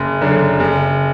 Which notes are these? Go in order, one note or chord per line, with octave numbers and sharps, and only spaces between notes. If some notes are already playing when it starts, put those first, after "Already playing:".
Already playing: F#1
F#2 D3
F#1